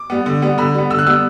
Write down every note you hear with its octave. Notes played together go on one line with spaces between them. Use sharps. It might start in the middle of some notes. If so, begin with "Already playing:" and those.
Already playing: D6
G3 B3
D3
G3 B3
D3 B5
G3 B3
D3 E6
F#6
G3 B3 E6